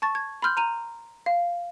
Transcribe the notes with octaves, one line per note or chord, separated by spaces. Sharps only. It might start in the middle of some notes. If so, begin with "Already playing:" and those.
A5 C#6 A6
G#6
B5 C6 F6 G6
A#5 D#7 F7
F5